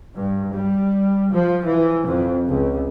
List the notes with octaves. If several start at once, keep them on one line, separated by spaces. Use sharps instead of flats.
G2
G3
F3
E3
F2
C#2